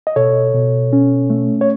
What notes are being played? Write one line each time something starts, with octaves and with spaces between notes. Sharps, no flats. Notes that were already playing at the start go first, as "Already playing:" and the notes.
D#5
B2 A4 C#5
B2
C#4
A3
C#5